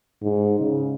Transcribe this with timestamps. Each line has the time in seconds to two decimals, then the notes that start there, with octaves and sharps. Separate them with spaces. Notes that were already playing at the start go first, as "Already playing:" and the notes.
0.22 G#2
0.60 C#3